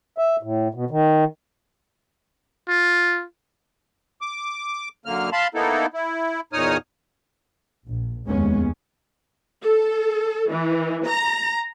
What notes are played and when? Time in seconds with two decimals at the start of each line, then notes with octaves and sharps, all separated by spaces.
0.18 E5
0.43 A2
0.74 B2
0.91 D#3
2.69 F4
4.21 D6
5.06 F#2 D3 A#3 F6
5.33 F5 A5 B5 C6
5.55 A#3 B3 D#4 E4 A4
5.94 E4
6.53 E2 A#2 D#4 C#5 D#6 F6
7.87 A#1
8.27 F1 D#2 G#3 B3 C#4
9.62 A4
10.50 E3
11.06 A#5